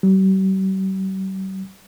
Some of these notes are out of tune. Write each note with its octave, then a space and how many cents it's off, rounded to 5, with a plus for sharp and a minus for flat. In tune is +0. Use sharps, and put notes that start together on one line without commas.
G3 -45